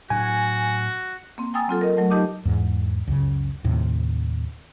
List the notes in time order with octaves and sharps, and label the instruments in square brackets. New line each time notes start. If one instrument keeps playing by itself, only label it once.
[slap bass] A2 F#3 D4 [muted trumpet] F#4 [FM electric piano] G#5
[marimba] A#3 C4
G5 G#5 A#5 D#6 E6 A6
F#3 C4 F4 A4
A#4 D#5
F#3 A3
D#4 G4 D#5 A5 D6
[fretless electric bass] E2 G#2
C#2 F#2 C#3
D#2 A2 C3